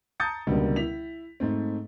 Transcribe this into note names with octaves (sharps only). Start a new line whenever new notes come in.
A5 A#5 D#6 G6 A6 C#7
C#2 B2 D3 G3 A#3
E4 B6 F7
G#2 A3 C4